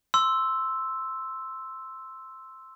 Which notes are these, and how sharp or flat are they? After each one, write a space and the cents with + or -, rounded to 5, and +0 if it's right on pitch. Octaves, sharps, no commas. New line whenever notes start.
C6 +0 E6 +0